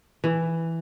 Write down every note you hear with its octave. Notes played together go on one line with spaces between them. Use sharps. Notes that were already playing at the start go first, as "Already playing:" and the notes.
E3